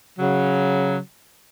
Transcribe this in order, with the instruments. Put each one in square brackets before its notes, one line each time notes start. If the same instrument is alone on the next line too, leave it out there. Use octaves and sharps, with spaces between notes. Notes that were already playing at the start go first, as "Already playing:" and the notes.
[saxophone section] C#3 F#3